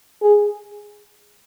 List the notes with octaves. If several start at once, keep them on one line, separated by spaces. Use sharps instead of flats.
G#4